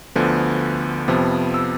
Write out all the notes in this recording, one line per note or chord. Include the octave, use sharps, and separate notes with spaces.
D2 D3 F3 B3
F2 C3 F3 B3
E6